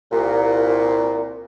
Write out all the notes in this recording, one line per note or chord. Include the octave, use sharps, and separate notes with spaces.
C2 A#2